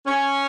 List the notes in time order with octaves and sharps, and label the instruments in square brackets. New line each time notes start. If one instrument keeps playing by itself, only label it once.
[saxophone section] C#4